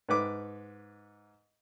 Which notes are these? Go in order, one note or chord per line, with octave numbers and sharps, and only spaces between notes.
G#2 B4 D6